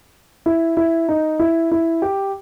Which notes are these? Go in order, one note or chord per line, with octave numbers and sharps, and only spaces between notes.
E4
E4
D#4
E4
E4
G4